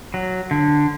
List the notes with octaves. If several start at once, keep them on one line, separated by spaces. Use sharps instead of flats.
F#3
D3